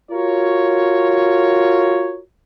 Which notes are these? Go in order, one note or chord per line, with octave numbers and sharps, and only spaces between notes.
F4 F#4 A#4 C#5